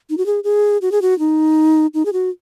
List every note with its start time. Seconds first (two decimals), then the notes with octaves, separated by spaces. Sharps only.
0.10 D#4
0.17 F#4
0.26 G#4
0.44 G#4
0.82 F#4
0.92 G#4
1.02 F#4
1.19 D#4
1.94 D#4
2.05 G#4
2.13 F#4